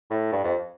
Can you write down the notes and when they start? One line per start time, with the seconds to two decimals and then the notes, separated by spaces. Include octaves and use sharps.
0.10 A2
0.32 G2
0.44 F2